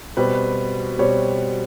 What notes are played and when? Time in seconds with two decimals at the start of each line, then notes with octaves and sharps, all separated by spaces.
0.17 B2 G3 C4 B4
0.99 B2 G3 C4 C#5